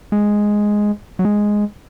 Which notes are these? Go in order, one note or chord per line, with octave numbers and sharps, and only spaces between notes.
G#3
F#3
G#3